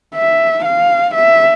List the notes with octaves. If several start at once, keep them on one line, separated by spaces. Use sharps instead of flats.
E5
F5
E5